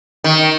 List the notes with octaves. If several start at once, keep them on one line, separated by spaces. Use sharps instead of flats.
D#3